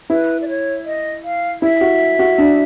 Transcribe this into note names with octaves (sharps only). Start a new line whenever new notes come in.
E4 B4
D5
C#5
D#5
F5
E4 E5
F#4
F#4
D4